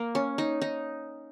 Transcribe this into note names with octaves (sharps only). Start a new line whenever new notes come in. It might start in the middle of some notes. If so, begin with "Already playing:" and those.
Already playing: A#3
C#4
D#4
D#4